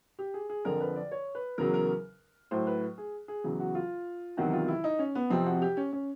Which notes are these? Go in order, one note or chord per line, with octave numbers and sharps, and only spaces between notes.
G4
G#4
G#4
F2 D3 F3 A#4
B4
D5
C#5
B4
E2 C#3 F#3 A#4
A#4
A2 F#3 C5
B4
G#4
G#4
E2 C#3 F#3
F#4
F4
E2 C3 D#3 F#3 F#4
F4
E4
D#4
C#4
B3
F2 C3 F3 C4
F#4
G4
C#4
C#4